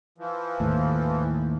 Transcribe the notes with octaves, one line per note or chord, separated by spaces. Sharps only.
E3 F3
D#2 A2